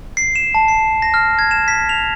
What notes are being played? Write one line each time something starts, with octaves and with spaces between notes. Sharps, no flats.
C7
E7
A5
C7
A#6
F6
G#6
E7
B6
F7